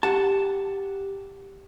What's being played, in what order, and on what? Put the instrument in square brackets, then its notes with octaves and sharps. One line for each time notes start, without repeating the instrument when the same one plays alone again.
[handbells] G4 [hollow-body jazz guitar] F#5 A5